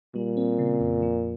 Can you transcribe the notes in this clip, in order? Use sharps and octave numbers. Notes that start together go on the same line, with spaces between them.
A#2 G3
C4
C#3
F2
F3